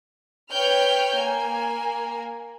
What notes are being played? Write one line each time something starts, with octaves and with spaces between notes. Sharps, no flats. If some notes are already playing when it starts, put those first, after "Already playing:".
B4 C#5 G5 F6 G6
A#3 G#5